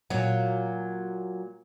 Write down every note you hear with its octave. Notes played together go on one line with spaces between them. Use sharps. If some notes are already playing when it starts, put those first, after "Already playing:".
A#2 F#3